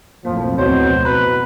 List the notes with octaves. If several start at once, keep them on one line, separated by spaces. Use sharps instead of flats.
B1 F2 A2 F3 A#3
D2 B2 C4 C5 C#5
B2 B4 A#5 B5 F#6